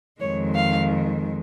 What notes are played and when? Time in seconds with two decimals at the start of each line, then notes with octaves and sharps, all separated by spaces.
0.20 F2 D#3 G#3 C#5
0.55 F5